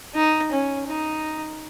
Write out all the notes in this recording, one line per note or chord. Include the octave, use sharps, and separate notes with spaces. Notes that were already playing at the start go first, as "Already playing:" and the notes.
D#4
C#4
D#4